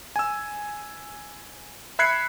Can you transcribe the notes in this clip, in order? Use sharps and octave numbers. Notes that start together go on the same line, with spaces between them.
G#5 E6
E5 B5 F#6 G#6 C7 C#7